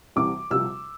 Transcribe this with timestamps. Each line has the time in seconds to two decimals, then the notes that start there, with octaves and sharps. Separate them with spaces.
0.16 C2 C3 E3 D6
0.51 C2 C3 F3 E6